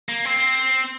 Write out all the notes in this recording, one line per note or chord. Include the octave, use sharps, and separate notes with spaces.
A#3
C4